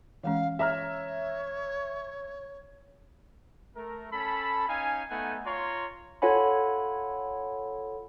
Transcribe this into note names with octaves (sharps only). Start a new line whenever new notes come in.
E3 G#3 C#4 F5
C#5 E5 A#5 F6
A3 A#4
C#4 A4 A5 B5
C#4 D#4 F5 G#5
A3 B3 D#4 F#5 G#5
F4 C#5 A#5 C6
F4 A4 C#5 F#5 G#5 B5